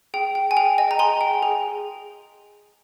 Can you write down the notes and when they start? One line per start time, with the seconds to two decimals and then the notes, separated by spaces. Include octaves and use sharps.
0.14 G#4 G5
0.35 G5
0.51 G#5
0.57 G#4 G5
0.78 D#5 G#5
0.91 A#5
0.99 G#4 G#5 C6
1.21 G5
1.43 G#4